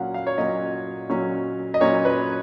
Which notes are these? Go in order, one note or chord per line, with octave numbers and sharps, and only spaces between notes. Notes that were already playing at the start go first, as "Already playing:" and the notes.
Already playing: A#2 F#3 C#4 F5 F#5
F5
C#5
A#2 F#3 C#4 D#5
A#2 F#3 C#4
D#5
A#2 F#3 C#4 C#5
B4